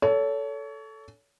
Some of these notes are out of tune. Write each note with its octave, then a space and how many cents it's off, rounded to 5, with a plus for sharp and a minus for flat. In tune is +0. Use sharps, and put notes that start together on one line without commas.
A4 +0 C#5 +30